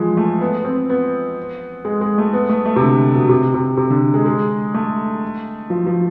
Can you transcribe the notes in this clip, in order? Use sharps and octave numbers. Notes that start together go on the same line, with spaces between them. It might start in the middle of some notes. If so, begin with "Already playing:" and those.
Already playing: E3 F3 G#3
A3
B3
C4
B3
G#3
G#3
A3
B3
A3
A3
C3
D3
B2
C3
C3
C3
D3
G#3
G#3
A3
F3
F3